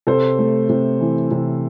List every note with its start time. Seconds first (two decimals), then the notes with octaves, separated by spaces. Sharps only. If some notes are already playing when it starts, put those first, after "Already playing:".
0.07 C3 A4 C5
0.39 A3
0.69 C3
1.01 E3
1.31 C3